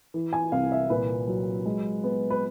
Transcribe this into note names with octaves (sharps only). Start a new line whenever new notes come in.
E3
G#5
C2 F5
E5
A#2 B4
F#3
G#3
B3
B4